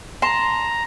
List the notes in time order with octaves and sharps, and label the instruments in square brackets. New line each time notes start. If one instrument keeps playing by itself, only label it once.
[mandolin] A5 C6 [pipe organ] A#5